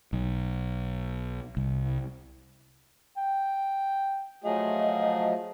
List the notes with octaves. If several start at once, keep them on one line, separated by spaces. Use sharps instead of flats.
B1
C2
G5
F3 F#3 A3 F4 G#4 D#5